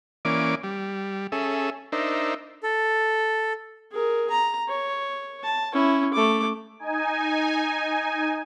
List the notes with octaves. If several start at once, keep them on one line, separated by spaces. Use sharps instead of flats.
E3 A#3 C#4 D5 D6
G3
C#4 G#4 A4 E5
D4 D#4 A#4 C5 E5
A4
G#4 A#4
A#5
C#5
A5
C#4 E4
A3 D6
D#4 G#5